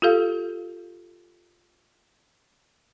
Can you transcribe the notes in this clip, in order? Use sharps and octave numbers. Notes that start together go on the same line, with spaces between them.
F4 G4 A4 F5